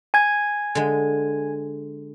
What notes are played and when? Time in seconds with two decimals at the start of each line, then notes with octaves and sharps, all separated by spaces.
0.14 G#5 G#6
0.75 D3 G#3